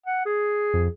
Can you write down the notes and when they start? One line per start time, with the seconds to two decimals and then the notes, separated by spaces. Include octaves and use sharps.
0.06 F#5
0.26 G#4
0.74 F2